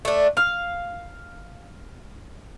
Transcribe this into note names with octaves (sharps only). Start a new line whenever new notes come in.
A3 D4
F5 F6